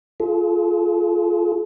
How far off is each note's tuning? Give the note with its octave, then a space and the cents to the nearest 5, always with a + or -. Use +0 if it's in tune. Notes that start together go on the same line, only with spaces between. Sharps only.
F4 -5 A4 -45